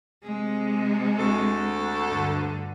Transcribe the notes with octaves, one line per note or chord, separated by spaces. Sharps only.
C3 G#3
D2 A4
G2 D3